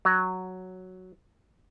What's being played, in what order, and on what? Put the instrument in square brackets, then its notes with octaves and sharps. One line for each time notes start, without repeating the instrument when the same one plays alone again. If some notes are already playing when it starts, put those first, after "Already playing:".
[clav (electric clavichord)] F#3